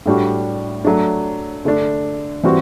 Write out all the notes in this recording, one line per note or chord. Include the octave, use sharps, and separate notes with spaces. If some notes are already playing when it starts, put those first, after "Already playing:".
A2 G3 D4 F#4
F#3 A3 D4
D3 A3 D4
E3 G3 C4 F#4